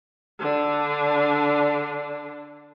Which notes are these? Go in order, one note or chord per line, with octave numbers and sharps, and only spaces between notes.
D3 D4